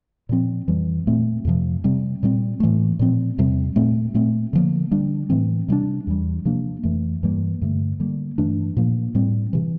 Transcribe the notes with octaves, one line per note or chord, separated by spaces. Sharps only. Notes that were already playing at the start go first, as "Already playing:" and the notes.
A#2 F3 C4
F2 E3 G3
A#2 A3 C4
F2 C3 F3
C3 G3 C4
A#2 G3 C4
A2 E3 A3
A#2 F3 C4
E2 C3 G3 C4
A#2 A3 C4
A#2 A3 C4
D3 F3 A#3
D3 G3 D4
A2 E3 A3 C4
C3 G3 A#3 D4
E2 E3 G3
C3 F3 A#3 D4
F2 E3 A3
G2 E3 G3 A#3
G2 D3 A3
D3 G3 A#3
G2 E3 A3 D4
A#2 F3 A#3
A2 G3 C4
C3 E3